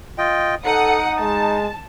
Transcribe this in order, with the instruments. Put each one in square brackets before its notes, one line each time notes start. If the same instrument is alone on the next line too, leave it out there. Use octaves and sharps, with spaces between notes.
[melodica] F4 D#5 G5
[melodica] D#4 [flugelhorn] A4 [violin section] F#5 D#6 C#7
[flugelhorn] G#3 [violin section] A5